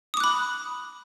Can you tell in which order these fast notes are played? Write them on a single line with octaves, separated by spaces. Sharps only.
D#6 D6 F#6 B5